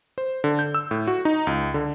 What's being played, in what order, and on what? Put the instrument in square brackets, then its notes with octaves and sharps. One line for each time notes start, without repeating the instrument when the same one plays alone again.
[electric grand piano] C5
D3
G6
E6
A2
F#4
D#4
C#2
D3